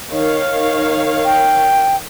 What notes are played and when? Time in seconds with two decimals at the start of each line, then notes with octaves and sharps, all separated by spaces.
0.11 D#3 C#5 F5
1.25 G5